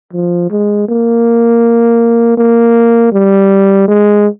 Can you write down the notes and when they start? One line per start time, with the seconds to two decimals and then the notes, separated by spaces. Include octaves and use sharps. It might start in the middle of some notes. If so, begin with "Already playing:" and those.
0.13 F3
0.51 G#3
0.89 A#3
2.38 A#3
3.13 G3
3.88 G#3